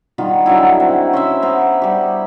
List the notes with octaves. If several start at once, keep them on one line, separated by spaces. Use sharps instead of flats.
D#3 G3 B3 F4
D3 F#3 D#4 E4
C4 F#5
C#4 C5 E5
B3 C5 A#5
G3 G4